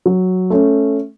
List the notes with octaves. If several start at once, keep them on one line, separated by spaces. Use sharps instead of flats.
F#3
A3 C#4